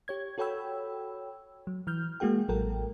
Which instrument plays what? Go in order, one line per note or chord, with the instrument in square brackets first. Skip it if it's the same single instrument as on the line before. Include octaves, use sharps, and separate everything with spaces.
[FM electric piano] G4 C#5 G#6
F#4 A4 C#5 G5 B5 E6
F#3
E3 F6 G6
G#3 A#3 F#4 G#4 G5
A1 F#3 A4 A#4 G5